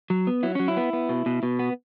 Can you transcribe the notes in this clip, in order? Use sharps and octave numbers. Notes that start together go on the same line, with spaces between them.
F#3
B3
F#3 E4
F#3 C#4
E4
B3
B3
B2
B2
B2
B3